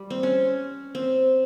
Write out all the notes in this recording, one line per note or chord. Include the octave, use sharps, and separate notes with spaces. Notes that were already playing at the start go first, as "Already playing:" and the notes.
Already playing: G3
C4
C#4
C4